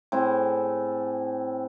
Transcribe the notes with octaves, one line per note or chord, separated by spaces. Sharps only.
A2 C4 E4 G#4